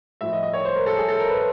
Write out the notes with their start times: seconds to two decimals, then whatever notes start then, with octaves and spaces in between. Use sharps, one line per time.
0.21 A2 F3 E5
0.32 D#5
0.43 D#5
0.53 C#5
0.65 C5
0.76 A#4
0.86 A4
0.97 G#4
1.09 A4
1.19 A#4
1.30 B4